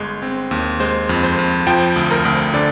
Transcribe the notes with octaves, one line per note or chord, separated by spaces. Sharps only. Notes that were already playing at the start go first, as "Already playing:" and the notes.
Already playing: G1 G#3
C4
D#2
G#3 C5
F2
C5
F2
F3 G5
D2
A#4
D2
D3 D5